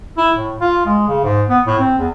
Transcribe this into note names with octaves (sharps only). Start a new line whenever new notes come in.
E4
A2
F4
G#3
C#3
G#2
B3
A2
C4
E2